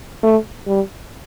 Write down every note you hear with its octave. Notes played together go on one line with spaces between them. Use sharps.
A3
G3